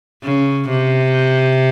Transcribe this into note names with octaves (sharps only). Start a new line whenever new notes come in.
C#3
C3